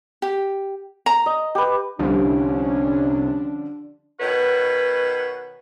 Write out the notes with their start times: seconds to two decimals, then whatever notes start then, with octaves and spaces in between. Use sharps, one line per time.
0.22 G4
1.06 A#5
1.26 D#5
1.55 G4 B4
1.99 C2 D3 F3 G3 C#4 D4
4.20 B2 D#3 F#4 B4 C#5